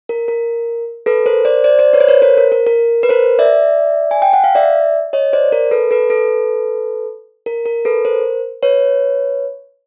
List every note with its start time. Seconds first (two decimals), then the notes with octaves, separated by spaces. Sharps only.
0.09 A#4
0.28 A#4
1.06 A4 B4
1.26 A#4 C5
1.45 C5 D5
1.64 C5 D5
1.79 C5 D5
1.93 B4 C#5
2.01 C5
2.08 B4 C#5
2.22 A#4 C5
2.37 A#4
2.52 A#4
2.67 A#4
3.03 B4
3.09 A#4 C5
3.39 D5 E5
4.11 G#5
4.22 G5
4.33 F#5
4.44 F5
4.55 D5 E5
5.13 C#5 D#5
5.33 C5 D5
5.52 A#4
5.71 A4 B4
5.91 A4 B4
6.10 A4 B4
7.46 A#4
7.65 A#4
7.85 A4 B4
8.05 A#4 C5
8.63 B4 C#5